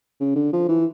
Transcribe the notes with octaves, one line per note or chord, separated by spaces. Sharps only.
C#3
D3
F3
E3